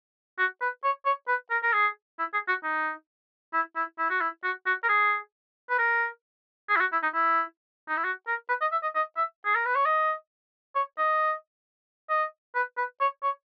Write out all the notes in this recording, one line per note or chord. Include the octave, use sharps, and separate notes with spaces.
F#4
B4
C#5
C#5
B4
A#4
A#4
G#4
E4
G#4
F#4
D#4
E4
E4
E4
F#4
E4
F#4
F#4
A#4
G#4
B4
A#4
G#4
E4
F#4
E4
D#4
E4
D#4
E4
F#4
A#4
B4
D#5
E5
D#5
D#5
E5
G#4
A#4
B4
C#5
D#5
C#5
D#5
D#5
B4
B4
C#5
C#5